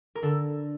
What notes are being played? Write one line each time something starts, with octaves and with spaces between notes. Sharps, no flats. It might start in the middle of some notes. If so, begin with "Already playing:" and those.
A#4
D3 A4